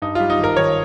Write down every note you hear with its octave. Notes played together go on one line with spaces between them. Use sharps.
G2 D#4
G3 F4
D#4
G#1
A#4
D#3 C#5